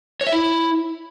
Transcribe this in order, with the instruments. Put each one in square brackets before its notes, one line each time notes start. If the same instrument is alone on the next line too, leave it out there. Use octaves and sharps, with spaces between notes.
[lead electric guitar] C#5
E5
E4